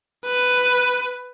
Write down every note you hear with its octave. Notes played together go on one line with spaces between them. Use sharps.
B4